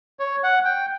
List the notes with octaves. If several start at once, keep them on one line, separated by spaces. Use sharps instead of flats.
C#5
F#5
G5